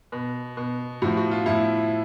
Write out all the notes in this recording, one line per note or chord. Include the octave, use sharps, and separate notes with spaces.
B2
B2
A2 F3 F#4
F#4
F4
A2 F3 E4